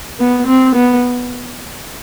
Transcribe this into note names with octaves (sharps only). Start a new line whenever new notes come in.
B3
C4
B3